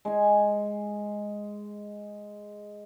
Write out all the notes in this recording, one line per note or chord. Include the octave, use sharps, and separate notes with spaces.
G#3 G#5